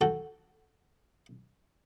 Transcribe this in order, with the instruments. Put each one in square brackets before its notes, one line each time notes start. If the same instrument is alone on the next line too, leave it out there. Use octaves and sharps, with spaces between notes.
[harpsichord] F#4 A4 G5